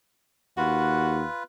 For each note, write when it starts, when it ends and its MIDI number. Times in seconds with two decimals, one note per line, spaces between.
0.58 1.24 39
0.58 1.43 65
0.58 1.25 66
0.58 1.43 71